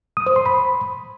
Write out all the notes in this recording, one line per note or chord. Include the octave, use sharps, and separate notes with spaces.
D#6
C5
C6
B5